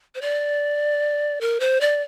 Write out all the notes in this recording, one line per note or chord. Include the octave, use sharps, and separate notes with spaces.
C5
D5
A#4
C5
D5